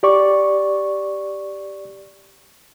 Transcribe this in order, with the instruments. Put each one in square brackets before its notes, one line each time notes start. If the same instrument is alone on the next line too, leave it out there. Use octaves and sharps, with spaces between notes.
[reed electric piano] G4 D5 C#6